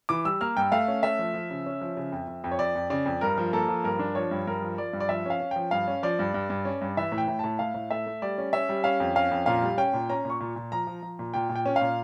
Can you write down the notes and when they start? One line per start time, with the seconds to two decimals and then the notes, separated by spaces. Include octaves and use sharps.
0.09 E3 D6
0.25 G3 E6
0.41 A#3 F6
0.57 G2 G5
0.72 A3 F5
0.88 C#4
1.03 A3 E5
1.19 F3
1.34 F3
1.50 C#3
1.66 C#4
1.81 F3
1.97 C#3
2.12 F2
2.28 F2
2.44 F2
2.51 C#5
2.59 F2 D5
2.75 F2
2.90 C#3 D5
3.06 F2
3.21 G2 A#4
3.38 F3
3.53 A#3 A4
3.68 F3
3.84 G2 A#4
3.99 D4
4.15 F3 C#5
4.31 G2
4.47 G2 A#4
4.62 F3
4.78 F3 D5
4.93 G2
5.00 D5
5.09 F3 E5
5.26 C#4 F5
5.40 C#4
5.51 F3 G5
5.71 G2 F5
5.88 C#4
6.03 F3 D5
6.19 G2
6.34 G2
6.50 G2
6.65 C#4
6.81 G2
6.97 E3 E5
7.12 A2
7.18 G5
7.28 A2
7.39 A2 A5
7.59 A2 F5
7.74 A2
7.91 A3 E5
8.06 A3
8.22 G3 D5
8.38 C#4
8.53 C#4 E5
8.69 G3
8.84 C#4 F5
9.00 F2
9.15 C#4 F5
9.31 F2
9.46 A#2 F5
9.62 G3
9.78 C#4 G5
9.93 A#2
10.09 C#4 A#5
10.25 A#2
10.30 C#6
10.40 A#2
10.56 A#2
10.72 F3 A#5
10.87 F3
11.02 F3
11.19 A#2
11.34 A#2 G5
11.49 A#2
11.55 G5
11.66 C#4
11.76 F5
11.81 A#2